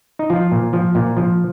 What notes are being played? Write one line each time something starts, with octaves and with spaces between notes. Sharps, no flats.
D#4
F3 F4
A#2
F3
A#2
F3